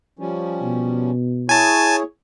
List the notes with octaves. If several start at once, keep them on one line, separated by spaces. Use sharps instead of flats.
F3 G3 C#4
B2
E4 G#4 C#5 G#5 A5